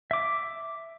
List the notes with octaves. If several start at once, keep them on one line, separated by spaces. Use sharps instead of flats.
E5 D6